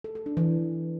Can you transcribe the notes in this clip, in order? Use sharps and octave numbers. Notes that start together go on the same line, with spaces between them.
A4
A4
D4
E3